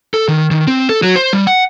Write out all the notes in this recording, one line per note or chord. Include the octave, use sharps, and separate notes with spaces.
A4
D#3
D#3
C4
A4
F#3
C5
G3
F#5